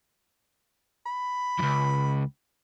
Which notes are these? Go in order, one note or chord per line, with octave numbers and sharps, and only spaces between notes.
B5
C#2 F#2